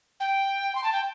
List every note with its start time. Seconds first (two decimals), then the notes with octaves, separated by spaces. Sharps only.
0.20 G5
0.75 C6
0.84 A5
0.92 G5